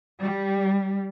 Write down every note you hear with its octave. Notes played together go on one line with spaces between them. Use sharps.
G3